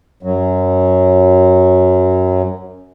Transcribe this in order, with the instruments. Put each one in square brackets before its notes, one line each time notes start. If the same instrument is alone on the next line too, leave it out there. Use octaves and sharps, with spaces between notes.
[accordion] F#2 F#3